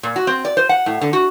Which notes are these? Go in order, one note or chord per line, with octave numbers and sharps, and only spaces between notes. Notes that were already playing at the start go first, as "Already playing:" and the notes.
A#2
F#4
C4
D5
C5
F#5
A2
D3
F#4